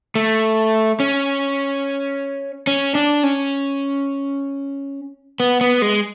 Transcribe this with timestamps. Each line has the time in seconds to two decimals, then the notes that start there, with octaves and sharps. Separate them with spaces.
0.15 A3
1.00 C#4
2.67 C#4
2.95 D4
3.24 C#4
5.40 B3
5.61 B3
5.82 G#3